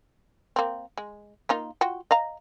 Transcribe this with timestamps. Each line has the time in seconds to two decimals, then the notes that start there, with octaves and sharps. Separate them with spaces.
0.56 A#3 C4
0.98 G#3
1.49 A#3 D#4 F4
1.81 F4 F#4 G5
2.11 D#5 F5 A#5